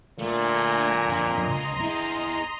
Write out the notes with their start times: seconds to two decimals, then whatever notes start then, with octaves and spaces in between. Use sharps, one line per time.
0.19 A#2 D3 A3 G#5 A#6
1.05 F2 D#5 A#5 C6
1.47 C#2
1.80 E4 G#4